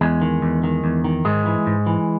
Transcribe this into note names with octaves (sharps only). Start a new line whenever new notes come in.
E2 G#3
D#3
E2
D#3
E2
D#3
G#2 G#3
E3
G#2
E3